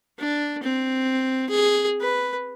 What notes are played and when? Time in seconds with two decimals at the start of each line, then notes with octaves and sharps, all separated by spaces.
0.19 D4
0.63 C4
1.50 G#4
2.01 B4